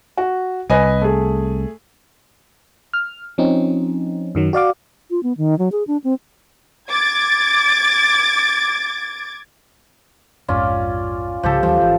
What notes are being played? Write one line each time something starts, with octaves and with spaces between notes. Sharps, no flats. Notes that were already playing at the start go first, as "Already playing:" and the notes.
F#4
C2 B4 D#5 G#5
A3 G#4
F6
F3 C4 C#4 D#4
F#2 D#3 F#3
F#4 D5 F5 D6
F4
B3
D#3
F#3
G#4
D4
C4
D6 G#6 A6
A#1 F2 G#2 C#4 F4 D5
C2 G#2 C#3 F3 G4 A4
D#2 E3 F3 G3
G#1 E3